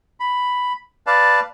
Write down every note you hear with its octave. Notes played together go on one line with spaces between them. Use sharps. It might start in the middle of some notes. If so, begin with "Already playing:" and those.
B5
B4 D5 F5 A5